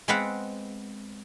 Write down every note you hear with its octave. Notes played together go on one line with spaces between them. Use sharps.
G#3 B3 C4 B4 F5 F#5